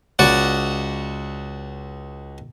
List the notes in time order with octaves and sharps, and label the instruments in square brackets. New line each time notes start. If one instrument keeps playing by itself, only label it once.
[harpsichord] C#2 F#4 D5 F#5